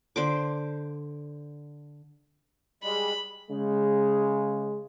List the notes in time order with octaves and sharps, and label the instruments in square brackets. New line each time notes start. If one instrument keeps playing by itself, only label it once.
[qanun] D3 C5 D6
[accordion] G3 G#3 [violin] B5
[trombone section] C#3 G#3